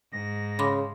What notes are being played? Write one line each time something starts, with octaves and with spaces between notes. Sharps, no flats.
G#2 A#6
C#3 B5 C6 D6